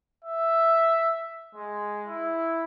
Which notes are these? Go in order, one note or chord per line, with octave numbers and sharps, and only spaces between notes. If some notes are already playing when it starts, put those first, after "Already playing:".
E5
G#3
E4